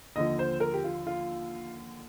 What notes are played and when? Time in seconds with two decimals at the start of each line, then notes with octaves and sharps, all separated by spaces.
0.16 D#2 D3 F3 D#5
0.39 C5
0.60 A#4
0.74 G4
0.84 F4
1.07 F4